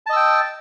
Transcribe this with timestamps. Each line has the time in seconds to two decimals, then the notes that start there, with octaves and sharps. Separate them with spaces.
0.06 A5
0.10 D#5
0.13 E6
0.16 G5